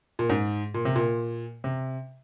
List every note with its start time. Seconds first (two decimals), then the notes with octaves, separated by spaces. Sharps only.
0.19 A#2
0.29 G#2
0.74 A#2
0.85 C3
0.96 A#2
1.64 C3